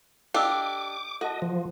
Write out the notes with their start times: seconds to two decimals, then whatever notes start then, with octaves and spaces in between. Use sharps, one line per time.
0.34 D4 G4 A4 D#5 F5 D6 E6
1.21 F#4 A4 D#5 A5
1.42 F3